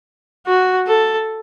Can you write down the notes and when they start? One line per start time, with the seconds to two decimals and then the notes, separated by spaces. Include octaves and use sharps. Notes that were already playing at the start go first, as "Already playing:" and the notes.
0.46 F#4
0.87 A4